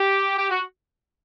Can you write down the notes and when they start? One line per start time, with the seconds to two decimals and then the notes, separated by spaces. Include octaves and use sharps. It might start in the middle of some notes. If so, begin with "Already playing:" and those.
Already playing: G4
0.38 G4
0.50 F#4